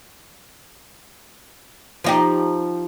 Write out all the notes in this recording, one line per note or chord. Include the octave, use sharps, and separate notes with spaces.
F3 D#4 G4